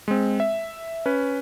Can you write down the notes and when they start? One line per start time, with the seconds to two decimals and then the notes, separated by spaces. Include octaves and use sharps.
0.08 G#3 C4
0.40 E5
1.06 C#4 B4